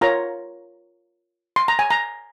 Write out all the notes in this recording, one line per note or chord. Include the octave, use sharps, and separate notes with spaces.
F4 A#4 C#5 A#5
C6
A#5
G#5
A#5